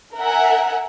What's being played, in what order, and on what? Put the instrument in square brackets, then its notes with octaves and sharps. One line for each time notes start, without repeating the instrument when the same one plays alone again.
[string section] A#4 E5 F#5 G#5